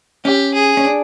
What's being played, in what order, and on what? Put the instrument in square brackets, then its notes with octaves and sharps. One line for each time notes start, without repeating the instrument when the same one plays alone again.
[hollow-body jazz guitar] C#4 [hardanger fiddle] G4
[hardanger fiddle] G#4
[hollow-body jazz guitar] C#4
D4